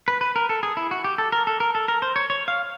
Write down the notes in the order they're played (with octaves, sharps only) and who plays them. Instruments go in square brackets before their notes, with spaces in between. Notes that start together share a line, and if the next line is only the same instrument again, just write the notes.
[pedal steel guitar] B4
B4
A#4
A4
G#4
E4
F#4
G4
A4
A#4
A4
A#4
A4
A#4
C5
C#5
C#5
F5